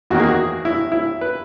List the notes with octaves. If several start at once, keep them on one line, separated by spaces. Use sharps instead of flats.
E2 D#3 A#3 F#4
G#4
F#4
E4
E4
B4